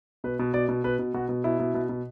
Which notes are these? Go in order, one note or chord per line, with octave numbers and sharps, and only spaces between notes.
B2 B4
B2
B2 D5
B2
B2 B4
B2
B2 F#4
B2
B2 E4
B2
B2
B2